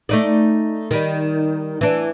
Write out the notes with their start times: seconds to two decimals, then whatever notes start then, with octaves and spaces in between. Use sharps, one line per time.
0.09 A3 D#4 D5
0.91 D#3 G3
1.81 E3 D4